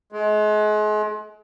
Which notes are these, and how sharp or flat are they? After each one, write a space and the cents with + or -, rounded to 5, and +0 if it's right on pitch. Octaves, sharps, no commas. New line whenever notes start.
G#3 +35